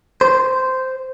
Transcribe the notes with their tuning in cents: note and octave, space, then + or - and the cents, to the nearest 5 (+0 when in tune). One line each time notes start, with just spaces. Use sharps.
C5 -10